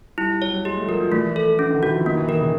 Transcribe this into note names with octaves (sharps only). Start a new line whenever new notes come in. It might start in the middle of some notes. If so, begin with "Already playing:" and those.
G3 E4
G3
F#3 C#5
G3
G#3 G4
A3
F3
F#3 A#4
F3
E3 A3
A4
D3 C#4
D#3
E3 F#4
F3
D#3 A#3
E3
D#3 A#4
C#3